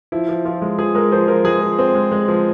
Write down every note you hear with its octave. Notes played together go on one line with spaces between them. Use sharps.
F3 E4
F3
F3 F4
G#3
F3 G#4
G#3 A#4
F3 C5
F3 A#4
G#3 G#4
F3
C4
G#3
G#3
F3